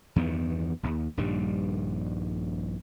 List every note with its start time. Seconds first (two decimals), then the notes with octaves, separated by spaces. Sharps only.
0.16 E2 G2 D#3 B3
0.83 D#1 D#2
1.17 A#1 G2 D#3 G3